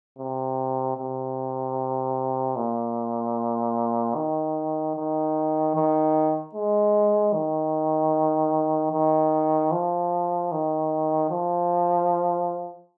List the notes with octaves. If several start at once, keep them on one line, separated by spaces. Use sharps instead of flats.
C3
C3
A#2
D#3
D#3
D#3
G#3
D#3
D#3
F3
D#3
F3